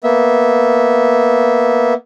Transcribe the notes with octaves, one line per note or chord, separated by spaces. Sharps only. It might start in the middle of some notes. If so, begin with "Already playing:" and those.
A#3 B3 E5